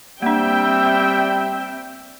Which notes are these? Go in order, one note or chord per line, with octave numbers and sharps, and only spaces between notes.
G3 A#3 C4 D4 E5 G5